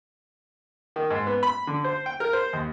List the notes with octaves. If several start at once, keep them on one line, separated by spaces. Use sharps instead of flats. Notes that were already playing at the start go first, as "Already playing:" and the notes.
D#3
G#2
B3
B5
D3
C5
G5
A#4
C5
D#2